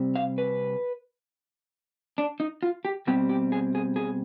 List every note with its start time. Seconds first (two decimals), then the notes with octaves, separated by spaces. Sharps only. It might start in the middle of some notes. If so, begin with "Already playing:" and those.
Already playing: C3 G3 C4
0.16 F5
0.38 B4
2.18 D4
2.40 D#4
2.63 F4
2.85 G4
3.07 B2 G3 C4 G4
3.29 G4
3.52 G#4
3.75 G#4
3.96 G#4